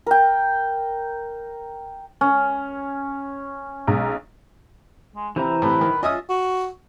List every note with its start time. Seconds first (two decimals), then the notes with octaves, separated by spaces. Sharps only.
0.06 A#4 G5
2.21 C#4
3.87 B1 G#3 A#5
5.16 G#3
5.36 C3 E3 E4 C5 A#5
5.62 A2 C3 B4
5.81 D#3
6.03 C#4 F4 D#5 E5 D#6
6.30 F#4